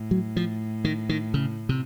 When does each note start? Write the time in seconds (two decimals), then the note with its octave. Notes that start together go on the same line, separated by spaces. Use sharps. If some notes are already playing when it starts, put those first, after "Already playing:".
Already playing: A2
0.11 F#3
0.36 F3
0.85 D#3
1.09 D#3
1.34 C#3
1.69 C3